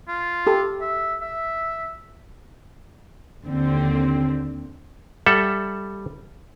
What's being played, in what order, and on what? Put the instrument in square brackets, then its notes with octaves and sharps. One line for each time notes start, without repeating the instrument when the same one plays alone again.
[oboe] F4
[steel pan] G4 A4
[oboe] E5
E5
[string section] D#2 D3 C4
[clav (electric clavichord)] G3 A4 E5 F#5